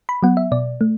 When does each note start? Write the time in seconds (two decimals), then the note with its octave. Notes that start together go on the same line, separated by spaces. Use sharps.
0.09 B5
0.23 F#3 B3 F#5
0.37 E5
0.52 B2 D5
0.81 A3